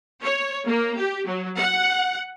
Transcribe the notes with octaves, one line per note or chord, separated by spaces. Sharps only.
C#5
A#3
G4
F#3
F#5